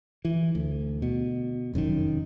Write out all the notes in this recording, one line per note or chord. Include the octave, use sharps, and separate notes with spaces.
E3
D2
B2
F1 F#2 C3 D#3